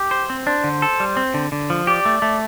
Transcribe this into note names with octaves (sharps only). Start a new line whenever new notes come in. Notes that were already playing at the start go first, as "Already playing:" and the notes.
Already playing: G4
C5
C4
D4 C5
D3
A4
G3
C4
D3
D3
F3
G4 D5
A3
A3